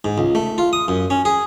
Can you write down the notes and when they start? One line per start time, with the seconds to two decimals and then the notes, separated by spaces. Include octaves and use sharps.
0.05 G#2
0.18 C#2
0.35 A3
0.58 F4
0.73 D#6
0.88 F#2
1.10 C#4
1.25 G#4